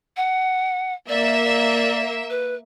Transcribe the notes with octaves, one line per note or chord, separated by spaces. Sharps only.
F#5
A#3 D5 E5
D5
B4